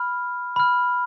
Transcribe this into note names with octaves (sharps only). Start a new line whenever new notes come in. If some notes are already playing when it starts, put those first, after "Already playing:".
Already playing: B5 F6
B5 F6